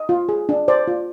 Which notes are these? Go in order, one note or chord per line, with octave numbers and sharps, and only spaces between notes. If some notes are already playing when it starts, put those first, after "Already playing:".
Already playing: D#5
F4
G#4
D4
C5 D5
F4